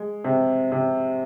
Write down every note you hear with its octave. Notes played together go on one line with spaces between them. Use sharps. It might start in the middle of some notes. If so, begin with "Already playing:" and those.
Already playing: G#3
C3
C3